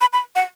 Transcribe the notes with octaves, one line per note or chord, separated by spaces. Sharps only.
B5
B5
F#5